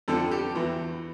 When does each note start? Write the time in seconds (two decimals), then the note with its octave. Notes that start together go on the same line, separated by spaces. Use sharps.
0.08 F2 D3 F3 A4
0.31 G4
0.55 E2 E3